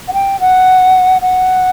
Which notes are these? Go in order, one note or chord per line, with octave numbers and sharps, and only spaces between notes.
F#5
G5
F#5
F#5